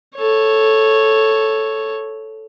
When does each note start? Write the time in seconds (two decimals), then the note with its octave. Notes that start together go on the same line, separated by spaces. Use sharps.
0.16 A4 C#5